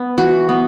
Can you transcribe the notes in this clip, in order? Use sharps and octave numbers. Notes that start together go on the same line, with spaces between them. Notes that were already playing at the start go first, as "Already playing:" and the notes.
Already playing: B3
E3 F#4
B3